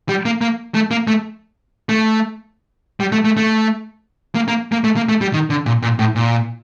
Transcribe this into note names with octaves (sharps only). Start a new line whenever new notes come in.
G3
A#3
A#3
A3
A#3
A3
A3
G3
A3
A3
A3
A#3
A#3
A#3
A3
A#3
A3
G3
D#3
D3
A#2
A#2
A2
A#2